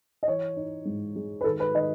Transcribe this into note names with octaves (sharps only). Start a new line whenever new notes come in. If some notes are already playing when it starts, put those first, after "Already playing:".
D#5
E3 C#5
D#4
G#2
G#3
B4
D#3 A4
B4
D#3 D#5